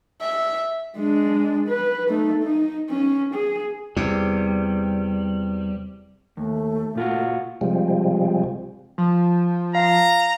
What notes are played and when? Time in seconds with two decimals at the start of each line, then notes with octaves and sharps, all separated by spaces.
0.21 E5
0.97 G#3 D4
1.68 B4
2.09 A3 D#4
2.43 D#4
2.90 C#4
3.34 G#4
3.97 E2 C3 G3
6.37 D#2 A3
6.95 A#2 F4 F#4
7.61 C3 F3 G3 G#3
8.98 F3
9.75 F5 A#5